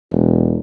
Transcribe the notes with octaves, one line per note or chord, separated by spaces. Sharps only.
E1